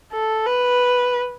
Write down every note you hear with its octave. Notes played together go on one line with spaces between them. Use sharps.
A4
B4